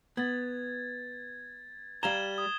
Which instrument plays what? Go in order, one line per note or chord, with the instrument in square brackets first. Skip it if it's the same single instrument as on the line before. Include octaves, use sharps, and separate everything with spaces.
[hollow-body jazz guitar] B3 [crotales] G#6 A6
[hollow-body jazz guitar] G3 F5 A#5 [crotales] G#6 E7 G7
[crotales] D#6